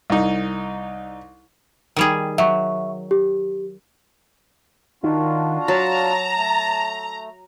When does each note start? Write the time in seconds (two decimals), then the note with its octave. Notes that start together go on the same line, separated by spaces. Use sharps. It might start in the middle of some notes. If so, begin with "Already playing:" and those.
0.10 C2 D#4
1.96 D#3 G3 G#4
2.38 F#3 E5 C#6
3.11 G4
5.03 D#3 D4 F4 F#4
5.68 F#3 A5 A#5
6.37 A3